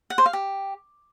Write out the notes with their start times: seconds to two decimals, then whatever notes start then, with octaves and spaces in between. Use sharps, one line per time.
0.10 F#5
0.18 C5
0.26 F5
0.33 G4